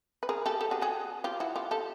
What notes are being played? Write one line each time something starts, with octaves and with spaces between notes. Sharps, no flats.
B4
G#4 A#4
G4 A4
G4 A4
F#4 G#4
F#4 G#4
F4 G4
E4 F#4
F4 G4
G4 A4